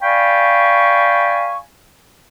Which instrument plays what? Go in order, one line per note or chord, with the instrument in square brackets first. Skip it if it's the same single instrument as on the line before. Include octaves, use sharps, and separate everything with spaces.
[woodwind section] D5 F5 G5 G#5 B5 C#6